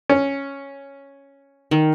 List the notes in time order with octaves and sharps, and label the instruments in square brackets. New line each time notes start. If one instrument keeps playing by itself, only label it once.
[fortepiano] C#4
[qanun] D#3